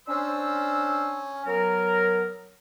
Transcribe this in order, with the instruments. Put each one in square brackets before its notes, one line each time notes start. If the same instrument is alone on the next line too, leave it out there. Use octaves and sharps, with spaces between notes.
[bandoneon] C#4 [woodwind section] D4 C5 E6
[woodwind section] F#3 A#4 [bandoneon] B3